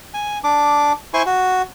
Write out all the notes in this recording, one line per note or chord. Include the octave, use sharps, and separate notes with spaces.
G#5
D4 D6
E4 C5 G#5 C6 C#6
F#4